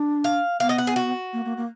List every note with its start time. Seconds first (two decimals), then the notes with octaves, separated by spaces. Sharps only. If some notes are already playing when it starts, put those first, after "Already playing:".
Already playing: D4
0.24 F5
0.60 B3 F5
0.69 D#5
0.78 F#5
0.87 G#4
0.96 F#4
1.33 A#3
1.45 A#3
1.57 A#3